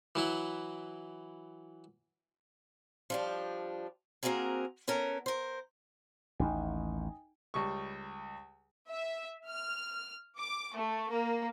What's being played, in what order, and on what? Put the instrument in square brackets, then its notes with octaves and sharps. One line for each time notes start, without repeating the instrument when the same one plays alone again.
[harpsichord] E3 F#3 E4
[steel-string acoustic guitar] F3 G3 D4
A#3 C4 C#4 F#4 G#4 A#4
B3 C#4 A4 A#4
A#4 C5
[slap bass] A1 D#2 [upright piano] D#4 G5 G#5
[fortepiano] C#2 G3 C#6
[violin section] E5
F6
D6
A3
A#3